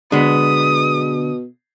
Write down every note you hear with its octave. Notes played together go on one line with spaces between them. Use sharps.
B2 D3 G#3 B3 D4 D#6